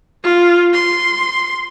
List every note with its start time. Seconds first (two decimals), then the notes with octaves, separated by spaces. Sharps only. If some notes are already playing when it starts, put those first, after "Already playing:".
0.23 F4
0.73 C6